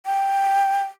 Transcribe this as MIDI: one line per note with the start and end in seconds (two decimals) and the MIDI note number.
0.06 0.83 79